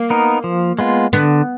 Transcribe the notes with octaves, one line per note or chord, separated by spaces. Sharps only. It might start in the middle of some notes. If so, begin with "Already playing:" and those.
Already playing: A#3
B3 D#4 A#4
F3
G#3 B3 F4
D3 B3